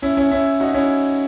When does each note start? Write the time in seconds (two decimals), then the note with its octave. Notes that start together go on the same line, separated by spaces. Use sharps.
0.02 C#4 E4
0.17 C#4 E4
0.31 C#4 E4
0.60 D#4 F#4
0.74 C#4 E4